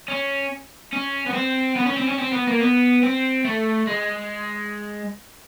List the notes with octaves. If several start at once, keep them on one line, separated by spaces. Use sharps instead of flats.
C#4
C#4
B3
C4
B3
C#4
C4
C#4
C4
B3
A#3
B3
C4
A3
G#3